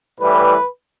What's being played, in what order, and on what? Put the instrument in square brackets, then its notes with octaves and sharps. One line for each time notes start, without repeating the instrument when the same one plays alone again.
[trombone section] A2 E3 G3 B4